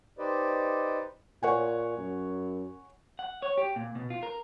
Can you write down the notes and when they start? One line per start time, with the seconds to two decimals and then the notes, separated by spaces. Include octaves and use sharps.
0.19 D#4 G4 B4 C5 D5 D#5
1.43 A#2 C#5 F#5 G#5
1.98 F#2
3.19 F#5
3.42 C#5
3.58 G4
3.76 A#2
3.95 B2
4.10 F4
4.23 A#4